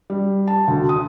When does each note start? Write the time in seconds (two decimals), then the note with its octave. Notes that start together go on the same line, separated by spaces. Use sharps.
0.10 G3
0.47 A5
0.68 D2
0.89 D#6